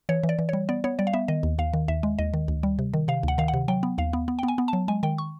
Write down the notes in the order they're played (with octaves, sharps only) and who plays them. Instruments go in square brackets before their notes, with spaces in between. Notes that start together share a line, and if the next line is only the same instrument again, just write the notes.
[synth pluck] E3 C#5
E3
D5
E3
G3 C#5
B3 D5
B3 C#5
G3 D5
F5
B3 E5
D#3 D#5
D#2
D#2 F5
D#3
D#2 E5
G#3
D#2 D#5
D#3
D2
G3
C3
D#3
C3 F5
D2 F#5
D#3 F5
F#5
C3
F#3 G5
B3
D#2 F5
B3
B3
B3 G5
G#5
B3
A5
F#3
G#3 G#5
D#3 G5
C#6